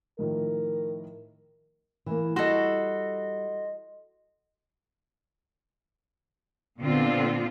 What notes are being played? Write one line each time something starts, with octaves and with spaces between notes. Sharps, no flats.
A2 D#3 F3 A#4
E3 A#3
G3 F#4 A4 D#5 C6
A#2 D3 B3 C4 F4